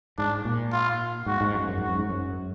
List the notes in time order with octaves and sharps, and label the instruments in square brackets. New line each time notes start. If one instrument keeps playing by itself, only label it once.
[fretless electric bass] G#2 [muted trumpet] D4
[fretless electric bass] A#2
[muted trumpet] F4
[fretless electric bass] G#2 [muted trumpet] F#4
[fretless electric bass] G#2
F#2
F#2
[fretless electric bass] G#2 [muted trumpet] F#4
[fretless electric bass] F#2
G#2
F#2